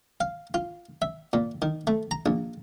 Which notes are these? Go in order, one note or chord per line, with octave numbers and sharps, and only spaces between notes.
F5
F4
E5
A#2
D#3
A3
A#5
A#1